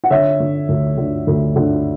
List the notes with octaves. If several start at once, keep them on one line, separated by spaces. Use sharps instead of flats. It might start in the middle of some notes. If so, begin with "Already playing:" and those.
F#5
D3 C#5 E5
D3
D2
D3
D2
D3